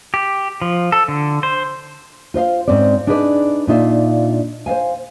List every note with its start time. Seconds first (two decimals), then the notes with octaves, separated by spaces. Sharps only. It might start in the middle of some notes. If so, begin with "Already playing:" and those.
0.14 G4
0.62 F3
0.92 A4
1.08 D3
1.43 C5
2.34 F4 C5 D#5 F5
2.68 G#2 C4 C#4 D5
3.07 D4 D#4 G#4 B4 C5 D5
3.67 A#2 D4 D#4 F4 C5 E5
4.66 C5 D5 F5 G#5